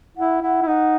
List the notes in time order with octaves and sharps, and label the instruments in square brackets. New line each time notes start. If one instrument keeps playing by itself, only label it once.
[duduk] E4 [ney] F#5
[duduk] E4 [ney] F#5
[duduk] E4
[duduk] D#4 [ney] F#5